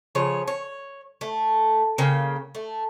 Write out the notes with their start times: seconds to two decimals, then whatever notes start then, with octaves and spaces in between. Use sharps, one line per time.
0.15 C#3 F3 C#5
0.48 C#5
1.21 A3
1.98 C#3 A#3 G5
2.55 A3